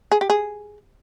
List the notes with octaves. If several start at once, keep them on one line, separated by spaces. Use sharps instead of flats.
G#4
G4
G#4